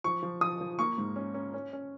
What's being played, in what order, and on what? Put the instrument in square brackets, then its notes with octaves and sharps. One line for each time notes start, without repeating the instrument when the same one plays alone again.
[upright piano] F3 C#6
F3
F3 D#6
F3
A#3 C#6
G#2
C#4
C#4
C#4
C#4